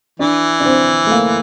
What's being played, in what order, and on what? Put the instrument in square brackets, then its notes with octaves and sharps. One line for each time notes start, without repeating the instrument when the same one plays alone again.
[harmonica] E3 [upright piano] D4
[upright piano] D4
C4
A3
A#3